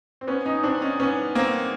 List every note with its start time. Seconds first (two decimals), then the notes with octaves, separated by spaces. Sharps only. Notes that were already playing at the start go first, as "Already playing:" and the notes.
0.21 C4
0.27 B3 C#4
0.46 C#4 D#4
0.63 C4 D4
0.81 C#4 D#4
1.00 B3 C#4
1.35 A#3 C4